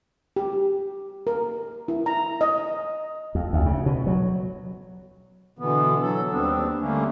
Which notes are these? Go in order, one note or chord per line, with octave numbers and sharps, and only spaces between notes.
G4
A#4
E4
A#5
D#5
F2
D2
C#3
B2
F#3
B2 D3 E3 B3
F#3 A4
D#2 G3 B3 C4 D4
D3 G3 A3 A#3 C#4